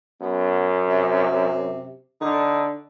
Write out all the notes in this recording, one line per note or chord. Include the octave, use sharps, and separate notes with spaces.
F#2 B3
C3
D3 D#4